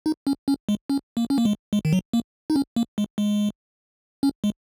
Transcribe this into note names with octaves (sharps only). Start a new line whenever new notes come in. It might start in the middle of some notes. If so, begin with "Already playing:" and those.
D#4
C#4
C#4
G#3
C#4
A#3
C#4
A#3
G#3
G#3
D#3
F#3
A#3
D#4
C#4
A#3
G#3
G#3
C#4
G#3